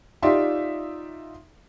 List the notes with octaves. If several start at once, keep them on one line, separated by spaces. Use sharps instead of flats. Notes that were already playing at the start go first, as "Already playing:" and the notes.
D#4 F4 G4 D5 E5 C6